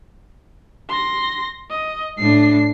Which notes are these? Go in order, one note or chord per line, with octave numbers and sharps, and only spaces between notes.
C6 A#6
D#5
A2 D4 C7